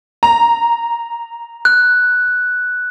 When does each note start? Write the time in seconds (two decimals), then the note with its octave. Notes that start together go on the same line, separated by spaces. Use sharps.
0.23 A#5
1.65 F#6